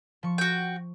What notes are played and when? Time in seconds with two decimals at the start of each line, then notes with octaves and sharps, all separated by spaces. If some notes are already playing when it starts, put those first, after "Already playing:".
0.23 F3 C#6
0.38 F#4 G5